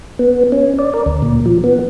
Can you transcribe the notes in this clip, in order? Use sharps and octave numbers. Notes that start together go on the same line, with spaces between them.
B3
C#4
D5
A#4
D2
A#2
F3
B3